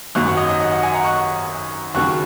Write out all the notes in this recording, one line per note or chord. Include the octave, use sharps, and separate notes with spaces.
G#1 F#2 F#3 C#6 F#6
F#5
D#5
D#5
F#5
F#5
D#5 G#5
F#5 A#5
C#6 F#6
D#2 C#3 F#3 C#6 F#6